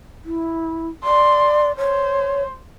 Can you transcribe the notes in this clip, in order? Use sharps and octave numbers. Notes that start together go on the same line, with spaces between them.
E4
D5 C6
C5 C#5